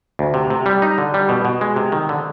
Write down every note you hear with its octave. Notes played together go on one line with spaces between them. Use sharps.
D2
C3
C3
G3
D#4
D3
G3
B2
B2
G#3
C3
D#3
D3